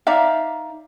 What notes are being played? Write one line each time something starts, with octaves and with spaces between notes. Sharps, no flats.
D#4 D5 E5 F5